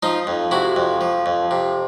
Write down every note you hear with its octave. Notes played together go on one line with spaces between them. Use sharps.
F3 D#4 F4
F2
C3 E4 F#4
F2
F3
F2
C3